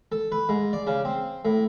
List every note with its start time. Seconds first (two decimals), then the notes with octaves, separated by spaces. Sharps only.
0.12 A4
0.32 B4
0.49 G#2
0.73 D5
0.87 C#3
1.05 C4
1.45 A2